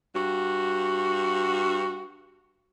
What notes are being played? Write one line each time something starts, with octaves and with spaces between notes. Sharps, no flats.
G2 F#4